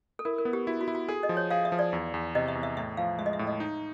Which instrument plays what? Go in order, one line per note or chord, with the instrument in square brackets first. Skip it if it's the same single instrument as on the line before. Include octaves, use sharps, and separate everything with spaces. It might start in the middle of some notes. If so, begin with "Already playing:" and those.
[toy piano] A4
[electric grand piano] E4 [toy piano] A#4
[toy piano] A#4
[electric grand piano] B3
[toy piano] G4
[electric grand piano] E4 [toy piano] F#4
[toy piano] F#4
[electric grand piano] E4
[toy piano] F#4
[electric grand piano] G#4 [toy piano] A4
[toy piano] D#5
[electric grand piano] F3
[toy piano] C#5
[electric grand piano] G#4 [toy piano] F5
[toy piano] E5
[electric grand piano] F3
[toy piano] D5
[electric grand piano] E2
E2
[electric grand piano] C3 [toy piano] D#5
[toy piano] E5
[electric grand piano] E2
[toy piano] E5
[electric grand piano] A2 [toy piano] E5
[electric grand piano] F3 [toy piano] F5
[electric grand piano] G#3 [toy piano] E5
[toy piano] D#5
E5
[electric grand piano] A2
[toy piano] D#5
[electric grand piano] D#4